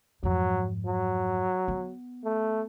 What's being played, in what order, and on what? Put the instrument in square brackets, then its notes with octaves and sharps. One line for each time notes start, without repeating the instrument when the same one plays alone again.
[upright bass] F2 G#2 [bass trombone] F#3
[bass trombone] F#3
[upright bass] B3
[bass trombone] A3